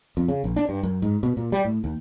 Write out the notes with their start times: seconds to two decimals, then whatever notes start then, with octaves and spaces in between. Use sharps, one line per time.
0.17 F2
0.28 C#3
0.44 A#1
0.56 D4
0.69 G2
0.83 F#2
1.02 G#2
1.23 B2
1.37 A#2
1.52 G3
1.65 A2
1.84 D#2